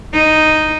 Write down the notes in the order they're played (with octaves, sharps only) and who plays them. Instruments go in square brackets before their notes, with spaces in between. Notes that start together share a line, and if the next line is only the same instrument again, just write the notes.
[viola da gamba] D#4